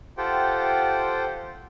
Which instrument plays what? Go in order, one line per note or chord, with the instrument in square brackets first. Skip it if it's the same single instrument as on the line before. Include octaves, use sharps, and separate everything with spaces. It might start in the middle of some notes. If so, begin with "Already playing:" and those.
[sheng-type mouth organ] F4 G4 A4 C5 F#5 G5